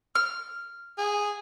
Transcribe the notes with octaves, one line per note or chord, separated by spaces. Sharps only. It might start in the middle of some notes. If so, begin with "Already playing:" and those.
F6
G#4